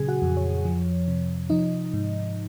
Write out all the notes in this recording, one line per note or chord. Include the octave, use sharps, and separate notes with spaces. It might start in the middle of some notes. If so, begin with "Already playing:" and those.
Already playing: A#2 C#3 F#3 G#4 G#5
F#4 F#5
F2
C#5
F3
C3
F3 D#4 D#5
G#2